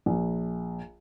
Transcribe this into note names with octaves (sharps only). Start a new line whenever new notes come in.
A#1